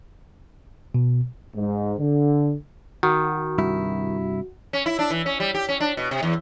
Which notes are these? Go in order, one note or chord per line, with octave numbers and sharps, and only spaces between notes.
B2
G#2
D3
D#3 F#4
C2 G2 E4
C#4
E4
D4
E3
C#4
G3
G4
C#4
D4
B2
C3
E2